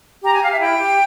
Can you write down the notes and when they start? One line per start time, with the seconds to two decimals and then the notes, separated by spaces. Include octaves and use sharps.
0.23 G4 A#5
0.33 G#5
0.42 G4 F5
0.51 E5
0.60 E4 G5
0.78 G4